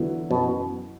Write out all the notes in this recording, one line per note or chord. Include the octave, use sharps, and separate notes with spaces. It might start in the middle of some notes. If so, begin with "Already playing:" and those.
Already playing: E2 D3 F#3 B3 E4
F#2 B2 E3 B3